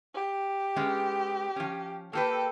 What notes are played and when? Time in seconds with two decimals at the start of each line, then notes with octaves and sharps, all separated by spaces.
0.15 G4
0.76 G#3 B3 C#4
1.56 F3 C#4
2.13 A#3 G4 A4 B4 G5